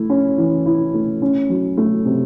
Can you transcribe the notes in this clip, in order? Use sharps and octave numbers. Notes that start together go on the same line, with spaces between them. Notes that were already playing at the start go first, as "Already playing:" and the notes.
Already playing: A3 E4
C#4
E3
E4
A3
C#4
F#3
A3
C3